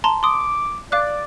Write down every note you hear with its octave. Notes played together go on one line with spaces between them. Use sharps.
A5 A#5 C6
C6 D6 D#6
D5 F5 D6 F#6